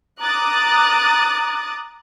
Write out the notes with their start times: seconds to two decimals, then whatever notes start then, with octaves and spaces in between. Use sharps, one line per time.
0.21 A#5 D6 D#6 F#6 A6